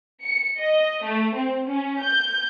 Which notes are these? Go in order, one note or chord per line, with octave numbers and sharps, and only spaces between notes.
C#7
D#5
A3
C4
C#4
G6